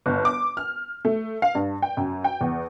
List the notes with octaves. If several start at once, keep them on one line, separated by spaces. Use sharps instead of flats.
G1
D6
F6
A3
F5
G2
G5
F#2
G5
E2